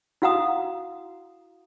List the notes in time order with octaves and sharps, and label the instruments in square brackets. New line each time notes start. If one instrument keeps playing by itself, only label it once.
[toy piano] E4 F#4 F5 F#5 A#5 D#6